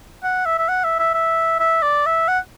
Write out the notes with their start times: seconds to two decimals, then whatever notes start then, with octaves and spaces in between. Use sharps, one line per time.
0.23 F#5
0.46 E5
0.58 E5
0.69 F#5
0.84 E5
0.99 E5
1.14 E5
1.60 E5
1.82 D5
2.06 E5
2.28 F#5